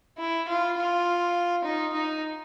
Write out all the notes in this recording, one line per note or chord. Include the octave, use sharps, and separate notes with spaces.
E4
F4
F4
D#4
D#4